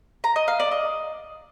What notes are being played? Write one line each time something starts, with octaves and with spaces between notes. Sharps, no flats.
A#5
D#5
F5
D5
D#5